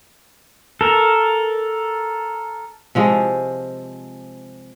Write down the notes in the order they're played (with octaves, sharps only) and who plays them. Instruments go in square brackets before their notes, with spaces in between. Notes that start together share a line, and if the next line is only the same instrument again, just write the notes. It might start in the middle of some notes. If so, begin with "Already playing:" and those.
[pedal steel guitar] A4 A#4
[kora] C3 F3 G#3